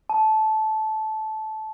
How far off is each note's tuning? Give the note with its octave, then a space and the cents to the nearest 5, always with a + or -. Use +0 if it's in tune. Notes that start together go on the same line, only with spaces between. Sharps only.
A5 -15